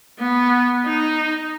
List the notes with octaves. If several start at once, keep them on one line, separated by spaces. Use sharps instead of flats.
B3
D#4